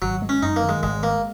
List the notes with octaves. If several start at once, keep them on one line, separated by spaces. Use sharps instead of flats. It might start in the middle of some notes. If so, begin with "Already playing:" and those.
G#1 F#3
G#3
C#4
F#2 D#4
A#3
D#3
G#3
G#1 G#3
G#3 A#3